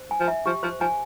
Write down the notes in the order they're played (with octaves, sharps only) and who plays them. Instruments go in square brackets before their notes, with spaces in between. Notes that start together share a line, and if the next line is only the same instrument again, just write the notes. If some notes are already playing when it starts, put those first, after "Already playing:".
Already playing: [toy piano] C5
G#5
[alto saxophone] F3
[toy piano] E5
[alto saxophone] F3 [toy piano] G4
[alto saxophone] F3 [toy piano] C5
[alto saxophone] F3 [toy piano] G#5